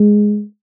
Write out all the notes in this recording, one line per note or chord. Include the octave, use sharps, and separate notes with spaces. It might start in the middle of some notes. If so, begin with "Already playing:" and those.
Already playing: G#3